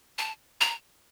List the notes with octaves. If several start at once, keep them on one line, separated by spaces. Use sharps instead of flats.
A5
A#5